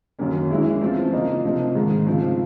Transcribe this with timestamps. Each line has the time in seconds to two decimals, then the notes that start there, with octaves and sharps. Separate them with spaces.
0.19 F#2 D#3 F#3 A#3 C#4
0.51 E3 G#3 C#4 E4
0.81 F3 A3 C4 F4
1.12 C#3 F3 A#3 D#4
1.44 C3 F3 A3 C4 D#4
1.75 G#2 D#3 G#3
2.06 C#3 F3 A3 C4